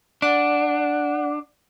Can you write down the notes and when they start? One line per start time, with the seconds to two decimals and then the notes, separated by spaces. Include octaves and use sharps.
0.22 D4 D5 F#5